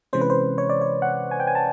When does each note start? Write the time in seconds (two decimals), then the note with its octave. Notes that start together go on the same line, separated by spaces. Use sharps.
0.13 C3 E3 G#3 C#4 C5
0.21 B4
0.30 C5
0.58 C#5
0.70 D5
0.81 C#5
1.02 F#5
1.31 G#5
1.40 G5
1.47 G#5
1.55 A5